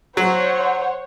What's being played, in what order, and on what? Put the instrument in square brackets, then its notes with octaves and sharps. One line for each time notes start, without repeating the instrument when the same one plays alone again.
[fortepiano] F#3 [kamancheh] C5 F#5 [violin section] C#5